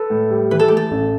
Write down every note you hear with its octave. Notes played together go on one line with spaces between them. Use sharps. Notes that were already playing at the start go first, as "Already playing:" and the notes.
Already playing: A4 B4
A2
G3
E3 B4
A4
A3 G4
A4
A1